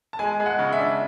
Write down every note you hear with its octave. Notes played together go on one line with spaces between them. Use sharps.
A5
G#3 G#5
G#3
F#5
C#3
E5
D4